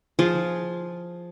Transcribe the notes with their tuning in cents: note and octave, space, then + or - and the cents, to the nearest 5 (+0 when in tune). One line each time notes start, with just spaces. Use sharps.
F3 +0 F4 +0 G#4 +0